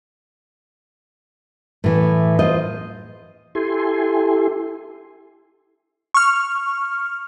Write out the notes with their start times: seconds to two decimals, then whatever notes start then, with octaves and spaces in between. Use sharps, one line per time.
1.84 A2 E3
2.39 F4 C5 D#5
3.55 E4 G4 A4 G#5 C6
6.14 C#6 F6